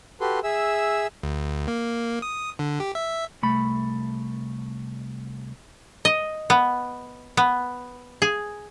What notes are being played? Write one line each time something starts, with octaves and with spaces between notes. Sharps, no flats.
F#4 G4 A4 B4 C6
G#4 E5 E6
D2
A#3
D#6
D3
G4
E5
C2 A3 B5
D#5
B3
B3
G#4